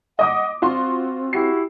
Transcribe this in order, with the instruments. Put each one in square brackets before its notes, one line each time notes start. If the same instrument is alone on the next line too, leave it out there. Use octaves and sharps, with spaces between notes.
[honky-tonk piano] D#5 D6 D#6 [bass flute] F#5
[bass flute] C4 [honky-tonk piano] F4 F#4 C6
[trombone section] E4 F#4 G4 [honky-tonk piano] C7